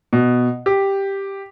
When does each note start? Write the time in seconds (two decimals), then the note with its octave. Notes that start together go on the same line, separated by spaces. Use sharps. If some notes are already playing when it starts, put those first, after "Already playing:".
0.13 B2
0.66 G4